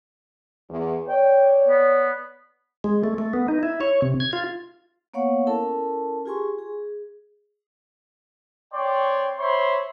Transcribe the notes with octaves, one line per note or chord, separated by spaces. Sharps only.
E2
C#5 D5 G5
B3
G#3
A3
A3
B3
D#4
E4
C#5
C3
G#6
F4
A#3 B3 C#5 F5 F#5 C#6
C#4 E4 A4 A#4 A5
F4 G4 G#4 G#5 C6 C#6
G#4
C4 C#5 D5 G5 C6
C5 C#5 E5 B5 C6